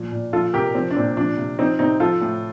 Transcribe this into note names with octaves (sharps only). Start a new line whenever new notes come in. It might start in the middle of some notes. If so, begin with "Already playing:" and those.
Already playing: A#2 F3
A#2
F3 F4 A4
C3 G4 A#4
F3 C4
D4
A#2 C4
F3 D4
C3
F3 C4 D#4
C3 C4 D#4
F3 F4 A4
A2